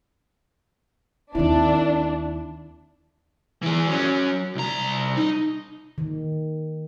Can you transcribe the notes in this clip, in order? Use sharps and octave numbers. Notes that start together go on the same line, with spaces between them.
D#2 D#3 C4 D4 E4
E3 G#4
F#3 C#4
C2 A#5
D#4
D#3